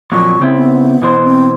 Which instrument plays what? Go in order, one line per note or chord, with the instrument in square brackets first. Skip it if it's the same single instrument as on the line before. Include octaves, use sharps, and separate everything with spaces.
[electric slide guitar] F2 A#2 F#3 [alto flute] C#6
[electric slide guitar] C#3 C4 E4
[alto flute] B3
[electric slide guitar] B2 E3 C5
[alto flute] C4